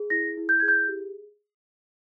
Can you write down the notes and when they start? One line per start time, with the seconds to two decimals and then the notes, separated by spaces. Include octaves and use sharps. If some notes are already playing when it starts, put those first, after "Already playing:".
Already playing: G#4
0.10 E4 A#6
0.37 E4
0.49 G6
0.60 G#4 G#6
0.68 G6
0.88 G4